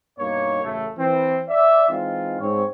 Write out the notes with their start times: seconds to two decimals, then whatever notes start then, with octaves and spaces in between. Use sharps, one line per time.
0.19 G2 B2 A#3 D#4 C#5
0.63 A1 F#2 C#3 A3
0.98 E3 C4
1.48 D5 E5
1.89 E3 G#3 C4 D#4 F4
2.40 G#2 C4 C#5